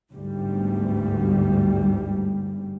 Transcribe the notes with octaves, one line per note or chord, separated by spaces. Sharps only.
G1 D2 G#2 G3